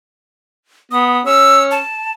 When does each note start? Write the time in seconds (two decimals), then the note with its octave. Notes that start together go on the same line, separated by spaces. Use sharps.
0.91 B3 D#6
1.25 C#4 E6
1.72 A5